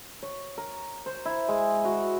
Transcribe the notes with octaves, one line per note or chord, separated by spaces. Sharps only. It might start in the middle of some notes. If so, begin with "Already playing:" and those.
C#5
A#4
C5
E4
G#3
F#4